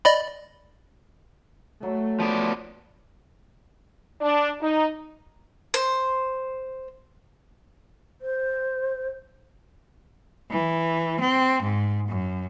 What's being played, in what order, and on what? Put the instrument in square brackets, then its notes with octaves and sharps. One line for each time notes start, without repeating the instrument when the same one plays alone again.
[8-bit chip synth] D5 D#5 B5
[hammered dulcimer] F#3 [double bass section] A3
[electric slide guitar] F3 B3 D5
[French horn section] D4
D#4
[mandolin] C5
[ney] C5
[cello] E3
C4
G#2
F#2